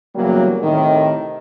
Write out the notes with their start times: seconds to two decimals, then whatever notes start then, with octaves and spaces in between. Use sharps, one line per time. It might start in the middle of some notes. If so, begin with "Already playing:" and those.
0.15 E2 C#3 F#3 G3 A#3
0.62 A2 C3 D#3